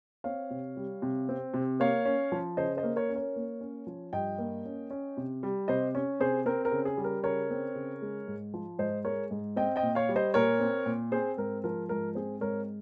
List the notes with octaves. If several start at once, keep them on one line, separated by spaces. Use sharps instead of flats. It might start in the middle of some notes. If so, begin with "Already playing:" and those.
C4 C#5 F5
C3
G3
C3
C4
C3
A#3 C#5 F5
C#4
F3
C#3 C5 D#5
C5 D#5
A#3
A#4 C#5
C#4
A#4 C#5
A#3
C#4
F3
G2 D#5 G5
A#3
C#4
C#4
C3
G3
C3 C5 D#5
C#4
C3 G#4 C5
C4 A#4
A#4
C#3
G#4
G3
A#4
C#3 A#4 C#5
C4
C#3
G#3
G#2
F3
G#2 C5 D#5
G#3 A#4 C#5
G#2
C4 D#5 G5
D#5 G5
A#2
C#5 F5
G3
C5 D#5
A#2 A#4 C#5
C4
A#2
C4 G#4 C5
G#2 A#4
F3 A#4
G#2 A#4
C4 G#4 C5
G#2 A#4 C#5